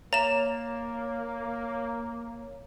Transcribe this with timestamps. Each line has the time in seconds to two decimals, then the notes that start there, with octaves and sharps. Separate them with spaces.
0.13 A#3 C#5 A#5 E7